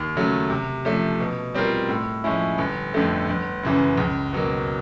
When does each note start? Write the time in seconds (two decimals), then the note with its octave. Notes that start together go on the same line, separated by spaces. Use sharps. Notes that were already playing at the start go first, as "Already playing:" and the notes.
Already playing: D#2
0.16 C#3 F#3 A3
0.50 C3
0.85 F3 A3
1.20 B2
1.54 G3 C4 F4 A#4
1.89 A2
2.24 F3 G#3 C#4 E4
2.58 G1
2.94 F2 D3 F3 A3
3.29 G1
3.63 F#2 C#3 E3
3.98 C#2
4.33 B2 F#3 A#3